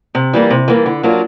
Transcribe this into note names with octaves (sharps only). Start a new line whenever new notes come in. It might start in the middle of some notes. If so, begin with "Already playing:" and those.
C3
E3 G3 A#3
C3
E3 G3 A#3
D3
F#3 A#3 D4 F4